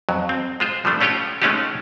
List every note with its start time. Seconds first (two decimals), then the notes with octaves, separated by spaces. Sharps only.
0.09 F2 F#3
0.29 C4
0.60 G#3 F4 C5
0.85 F3 G3 A3 D4
1.01 A3 C#4 F4 G4 C#5 G5
1.42 G#3 A3 C#4 D#4 F4 G4